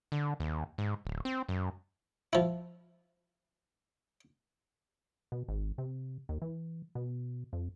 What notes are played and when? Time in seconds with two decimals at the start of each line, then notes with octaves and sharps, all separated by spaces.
0.12 D3
0.40 D#2
0.78 G#2
1.05 D1
1.25 C4
1.48 F#2
2.33 F3 E4
5.32 B2
5.48 G#1
5.78 C3
6.29 D#2
6.42 E3
6.95 B2
7.53 F2